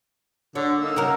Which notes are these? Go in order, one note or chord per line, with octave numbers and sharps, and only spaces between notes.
D3 C#5
A#3 D#4 E6
C#3 F#4 A#4